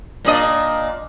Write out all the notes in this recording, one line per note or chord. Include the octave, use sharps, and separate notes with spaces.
A#2 D4 D#5